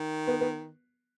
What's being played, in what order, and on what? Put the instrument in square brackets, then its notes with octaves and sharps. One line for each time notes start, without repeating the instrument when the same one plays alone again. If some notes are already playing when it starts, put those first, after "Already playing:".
Already playing: [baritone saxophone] D#3
[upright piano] B3
B3